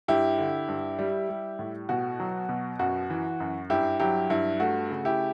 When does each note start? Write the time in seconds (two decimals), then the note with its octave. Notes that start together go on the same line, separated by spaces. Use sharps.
0.08 G2 E4 G4
0.38 D3
0.68 G2
0.99 G3
1.29 G3
1.59 A2
1.89 B2 F#4
2.20 F#3
2.49 B2
2.79 F#2 F#4
3.10 E3
3.40 F#2
3.70 G2 E4 G4
4.00 F#3 E4 G4
4.30 G2 E4
4.60 A3 F#4
4.90 C#3
5.05 E4 G4